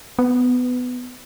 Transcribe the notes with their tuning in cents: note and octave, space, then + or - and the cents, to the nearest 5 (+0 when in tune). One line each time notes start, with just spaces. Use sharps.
B3 +15